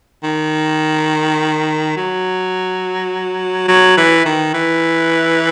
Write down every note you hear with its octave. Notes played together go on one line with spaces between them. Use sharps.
D#3
F#3
F#3
E3
D#3
E3